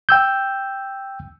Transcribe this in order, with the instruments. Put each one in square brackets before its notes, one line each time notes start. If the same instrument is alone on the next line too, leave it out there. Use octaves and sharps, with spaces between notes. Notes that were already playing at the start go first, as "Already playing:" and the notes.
[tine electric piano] G5 E6 G6